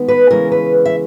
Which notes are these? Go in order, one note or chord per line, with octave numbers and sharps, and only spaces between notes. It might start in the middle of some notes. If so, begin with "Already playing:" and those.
Already playing: D#3 G#3 B3
B4
C#3 E3 G#3 C#4 A#4
B4
E5